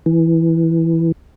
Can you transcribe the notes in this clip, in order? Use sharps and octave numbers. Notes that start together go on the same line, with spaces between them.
E3